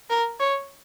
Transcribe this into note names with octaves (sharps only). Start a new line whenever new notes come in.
A#4
C#5